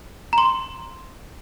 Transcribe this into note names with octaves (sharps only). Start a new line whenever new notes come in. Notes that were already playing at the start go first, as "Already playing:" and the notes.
A#5
C6